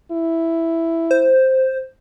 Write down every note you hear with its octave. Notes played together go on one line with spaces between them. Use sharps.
E4
C5